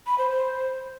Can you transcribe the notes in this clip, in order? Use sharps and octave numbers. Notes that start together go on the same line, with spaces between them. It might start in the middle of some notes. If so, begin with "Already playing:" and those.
B5
C5
C5